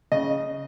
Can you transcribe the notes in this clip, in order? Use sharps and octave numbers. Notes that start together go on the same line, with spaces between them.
C#3 D#5